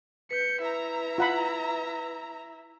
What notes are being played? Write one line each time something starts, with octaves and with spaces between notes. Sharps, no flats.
B4 G6 C#7
E4 E5 A#5
F4 F#5 B5